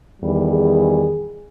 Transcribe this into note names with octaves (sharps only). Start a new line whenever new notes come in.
E2 D#3 G3
G#4